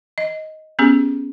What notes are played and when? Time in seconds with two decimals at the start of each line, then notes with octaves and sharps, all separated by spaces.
0.18 D#5
0.79 B3 C#4 G4 G#4